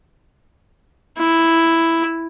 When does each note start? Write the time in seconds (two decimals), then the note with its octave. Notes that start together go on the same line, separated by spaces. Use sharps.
1.18 E4